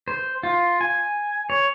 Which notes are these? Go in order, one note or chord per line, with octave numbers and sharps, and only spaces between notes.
C5
F4
G#5
C#5